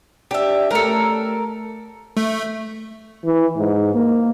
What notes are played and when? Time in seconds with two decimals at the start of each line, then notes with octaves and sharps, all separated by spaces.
0.31 D4 G4 E5
0.71 A3 C#4 G4 A4 A#4
2.17 A3
3.25 E3
3.56 G#2
3.94 A#3